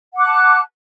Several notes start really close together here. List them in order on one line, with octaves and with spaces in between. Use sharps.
F#5 D6 F#6 A5